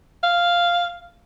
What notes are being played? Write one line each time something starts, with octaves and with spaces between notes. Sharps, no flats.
F5